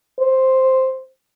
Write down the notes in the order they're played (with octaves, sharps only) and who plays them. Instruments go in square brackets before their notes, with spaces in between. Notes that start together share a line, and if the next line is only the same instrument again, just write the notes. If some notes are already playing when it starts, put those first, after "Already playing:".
[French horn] C5